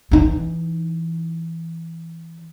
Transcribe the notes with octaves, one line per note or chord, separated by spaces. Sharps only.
E3 D#4